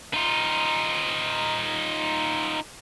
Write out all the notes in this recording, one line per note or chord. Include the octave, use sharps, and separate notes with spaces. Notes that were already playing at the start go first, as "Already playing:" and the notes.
D#4 F4